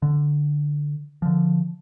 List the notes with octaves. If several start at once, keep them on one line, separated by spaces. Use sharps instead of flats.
D3
D3 F3